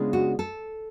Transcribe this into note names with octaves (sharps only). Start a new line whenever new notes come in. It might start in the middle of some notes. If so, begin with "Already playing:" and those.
Already playing: C#3 G#3 B3 D4 F4
F#4
A4